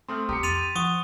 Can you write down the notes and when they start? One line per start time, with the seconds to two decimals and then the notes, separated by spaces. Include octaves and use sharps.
0.09 A3 C4 C6 D#6 F6
0.29 C2 G4 A#5 D#6 C#7
0.43 F2 C6 A6 D#7 F7
0.76 F3 F#5 C#6 D#6